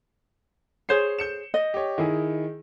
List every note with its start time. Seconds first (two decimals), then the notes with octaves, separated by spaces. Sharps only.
0.89 G#4 C5 C#5 C7
1.19 G6 C#7 E7
1.54 D#5
1.74 G4 C#5
1.98 D#3 E4 G#4